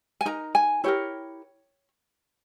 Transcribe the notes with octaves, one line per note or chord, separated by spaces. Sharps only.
G#5
D#4 A#4 A#5
G#5
E4 G4 A#4 C#5